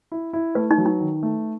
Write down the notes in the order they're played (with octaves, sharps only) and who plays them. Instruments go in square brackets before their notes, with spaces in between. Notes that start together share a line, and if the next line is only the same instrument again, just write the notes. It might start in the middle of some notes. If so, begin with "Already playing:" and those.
[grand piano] E4
E4
[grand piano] A3 [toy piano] B4
[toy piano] D#4
[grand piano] F#3
[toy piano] D#4
[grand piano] D#3
A3